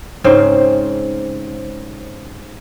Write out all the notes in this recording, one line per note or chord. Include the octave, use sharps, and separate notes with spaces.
G#2 C#3 C4 C5